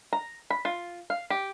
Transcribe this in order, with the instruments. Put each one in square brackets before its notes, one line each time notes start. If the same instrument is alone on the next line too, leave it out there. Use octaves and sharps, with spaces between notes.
[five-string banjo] A#5
B5
F4
F5
G4